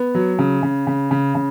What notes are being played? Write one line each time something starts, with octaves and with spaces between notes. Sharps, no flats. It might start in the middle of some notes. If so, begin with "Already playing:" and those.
Already playing: B3
F#3
C#3
C#3
C#3
C#3
C#3